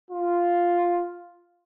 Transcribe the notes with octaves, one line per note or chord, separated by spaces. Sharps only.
F4